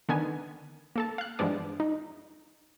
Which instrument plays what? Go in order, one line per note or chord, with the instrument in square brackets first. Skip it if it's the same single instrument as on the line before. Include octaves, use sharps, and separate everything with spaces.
[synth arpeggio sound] D3 D#3 B3 G#5
A#3 A4 A5
F5 F#6
G2 E3 F3 G#3 B3 D4
D#4